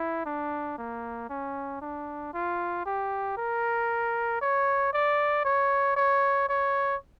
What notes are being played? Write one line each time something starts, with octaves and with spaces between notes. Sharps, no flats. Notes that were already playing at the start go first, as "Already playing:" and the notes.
Already playing: E4
D4
A#3
C#4
D4
F4
G4
A#4
C#5
D5
C#5
C#5
C#5